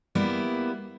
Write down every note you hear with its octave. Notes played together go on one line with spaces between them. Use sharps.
G3 A#3 B3 E4